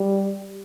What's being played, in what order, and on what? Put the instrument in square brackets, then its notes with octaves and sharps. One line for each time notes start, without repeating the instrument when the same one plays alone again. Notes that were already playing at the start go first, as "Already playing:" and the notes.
Already playing: [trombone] G3